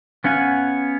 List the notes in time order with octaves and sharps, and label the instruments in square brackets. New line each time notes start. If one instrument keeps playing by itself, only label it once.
[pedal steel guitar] B3 C#4 F5 F#5 G#5